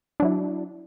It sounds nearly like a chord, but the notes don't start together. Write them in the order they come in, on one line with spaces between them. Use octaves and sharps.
D4 F#3 E4